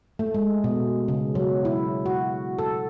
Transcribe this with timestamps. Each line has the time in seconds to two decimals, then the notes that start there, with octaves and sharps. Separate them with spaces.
0.19 A3
0.34 G#3
0.64 B2
1.08 C#3
1.35 F#3
1.65 E4
2.06 F#4
2.59 A4